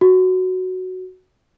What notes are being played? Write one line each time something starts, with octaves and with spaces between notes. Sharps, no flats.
F#4